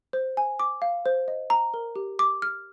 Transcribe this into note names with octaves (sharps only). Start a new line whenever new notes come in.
C5
G#5
D6
F5
C5
D#5
A#5
A#4
G4
D6
F6